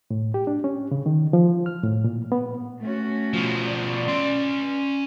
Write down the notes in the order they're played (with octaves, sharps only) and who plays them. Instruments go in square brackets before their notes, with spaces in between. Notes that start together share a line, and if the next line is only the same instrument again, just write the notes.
[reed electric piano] A2
G4
D4
C#4
C#3
D#3
F3
F6
A2
A#2
B3
[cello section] A3 C#4 F#4
[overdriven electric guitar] B2 F3
[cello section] D5
[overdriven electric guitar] C#4 C6